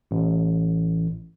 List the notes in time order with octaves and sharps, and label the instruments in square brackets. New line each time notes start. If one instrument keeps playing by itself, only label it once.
[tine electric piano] A1